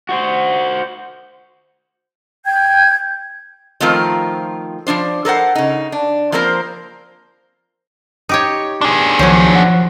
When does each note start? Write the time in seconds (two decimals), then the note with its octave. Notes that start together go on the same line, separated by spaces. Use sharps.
0.09 F#4 C5
2.45 G5 G6 G#6
3.80 D#3 F3 A3 C4 F4 A#4
4.87 F3 F#3 D4 C5
5.25 A4 A#4 C5 F#5
5.55 C#3 D#4
5.92 D4
6.32 F3 A#3 C4 A#4 C5
8.29 D#4 G4 C#5
8.81 D4 G#4
9.19 C#2 D#3 F3 F#3 C5 C#5
9.55 F#5